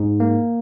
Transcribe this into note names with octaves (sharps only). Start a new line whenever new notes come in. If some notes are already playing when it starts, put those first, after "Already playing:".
Already playing: G#2
A#3